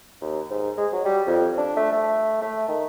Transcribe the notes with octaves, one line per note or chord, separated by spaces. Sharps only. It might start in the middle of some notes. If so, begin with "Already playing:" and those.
D#2
G#2
G#3
F#3
G3
F2
D4
A3
A3
A3
D#3